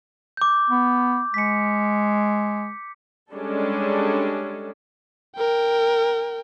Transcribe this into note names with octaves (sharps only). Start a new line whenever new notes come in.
D6 G6
B3
G#3 B6 C#7
G3 G#3 C#4 D4 A4
A#4 G5